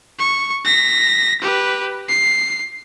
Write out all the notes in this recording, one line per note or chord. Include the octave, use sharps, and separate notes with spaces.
C#6
A#6 B6
G4 B4
C7